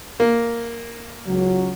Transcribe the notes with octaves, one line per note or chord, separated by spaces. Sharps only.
A#3
C#2 F#3